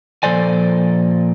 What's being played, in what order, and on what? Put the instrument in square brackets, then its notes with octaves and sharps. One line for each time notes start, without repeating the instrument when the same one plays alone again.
[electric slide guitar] A#2 F3 A4 C5 D5 G#5